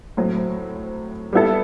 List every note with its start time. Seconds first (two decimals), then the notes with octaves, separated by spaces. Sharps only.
0.17 A2 F#3 C4
1.33 G3 B3 E4 A4